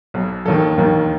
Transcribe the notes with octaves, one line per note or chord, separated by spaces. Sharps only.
B1 B2 F#3
E1 D#2 D#3 A4
E1 D#2 D#3